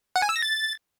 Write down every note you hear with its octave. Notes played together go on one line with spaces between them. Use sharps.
F#5
G#5
E6
A#6
A6